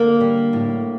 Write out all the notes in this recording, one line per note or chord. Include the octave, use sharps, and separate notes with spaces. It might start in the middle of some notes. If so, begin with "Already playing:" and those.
Already playing: D3 A#3
G3
A2